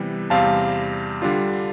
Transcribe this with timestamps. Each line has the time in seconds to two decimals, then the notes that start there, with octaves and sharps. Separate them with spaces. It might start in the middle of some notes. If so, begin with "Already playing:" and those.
Already playing: C3 E3 G3 B3
0.30 E2 C3 G3 C4 F5 A5
1.22 D3 G3 D4 F4